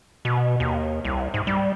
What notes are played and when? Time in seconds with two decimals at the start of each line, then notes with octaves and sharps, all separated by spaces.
0.25 B2
0.60 D#2
1.05 C2
1.34 G#2
1.47 G3